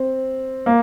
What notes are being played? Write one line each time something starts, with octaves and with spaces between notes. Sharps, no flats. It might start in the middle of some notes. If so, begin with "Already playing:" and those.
Already playing: C4
A#3